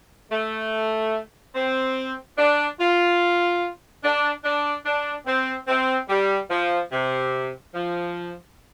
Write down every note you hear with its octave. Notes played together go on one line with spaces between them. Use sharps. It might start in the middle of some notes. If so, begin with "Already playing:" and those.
A3
C4
D4
F4
D4
D4
D4
C4
C4
G3
F3
C3
F3